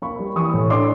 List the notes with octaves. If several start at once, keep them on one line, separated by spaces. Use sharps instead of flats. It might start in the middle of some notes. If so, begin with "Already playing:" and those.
A#3 B5 C#6
G3
E3 C#6 D#6
A2
D4 C6 D6